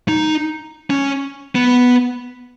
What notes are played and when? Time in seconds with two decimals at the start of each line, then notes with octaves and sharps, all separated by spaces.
0.09 D#4
0.90 C#4
1.55 B3